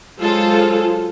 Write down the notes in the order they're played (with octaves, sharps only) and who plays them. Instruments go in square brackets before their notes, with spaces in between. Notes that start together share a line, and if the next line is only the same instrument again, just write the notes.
[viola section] F#3 G#3 F4 G#4 A4 C5